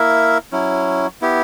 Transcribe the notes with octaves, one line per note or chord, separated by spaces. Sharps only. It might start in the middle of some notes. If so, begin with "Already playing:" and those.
Already playing: A#3 E4 A#4 E5
F#3 C#4 E4
B3 E4 G4